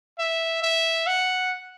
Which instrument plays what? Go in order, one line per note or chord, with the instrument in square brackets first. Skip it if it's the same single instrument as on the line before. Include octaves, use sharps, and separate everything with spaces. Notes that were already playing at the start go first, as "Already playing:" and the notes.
[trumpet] E5
E5
F#5